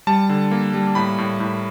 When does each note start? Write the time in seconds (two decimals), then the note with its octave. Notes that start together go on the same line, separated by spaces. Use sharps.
0.07 G3 A5
0.29 D3
0.51 A#3
0.74 G3
0.95 A2 B5
1.18 A2
1.40 A2